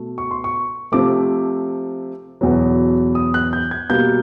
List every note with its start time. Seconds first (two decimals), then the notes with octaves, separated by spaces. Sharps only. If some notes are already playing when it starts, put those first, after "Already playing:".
Already playing: B2 A3
0.18 C#6
0.31 C6
0.44 C#6
0.92 C3 F3 A3 D6
2.41 E2 B2 F#3
3.15 D#6
3.34 F#6
3.53 G6
3.71 G#6
3.90 B2 G3 A#3 G6